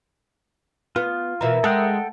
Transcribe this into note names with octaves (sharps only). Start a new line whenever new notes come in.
B3 F4
B2 E3 A#4 E5 A#5
G#3 A4 F#5 G5